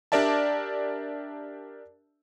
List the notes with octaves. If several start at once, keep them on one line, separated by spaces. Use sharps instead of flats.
D4 G4 A#4 D5 E5 A5